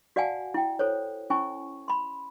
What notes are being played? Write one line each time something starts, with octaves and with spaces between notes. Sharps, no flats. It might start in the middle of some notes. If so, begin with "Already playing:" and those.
F#4 D5 F5 F#5 G#5 A5
E4 G5
A4 C5 C#5
C#4 E4 G#5 C#6
B5 C6